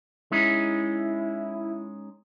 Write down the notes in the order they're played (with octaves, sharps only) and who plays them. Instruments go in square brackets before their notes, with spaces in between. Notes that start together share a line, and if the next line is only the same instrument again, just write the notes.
[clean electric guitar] G#3 C#4 D#4 [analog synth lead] E4